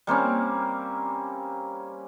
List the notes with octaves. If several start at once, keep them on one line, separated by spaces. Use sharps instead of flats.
G3 A#3 C4 C#4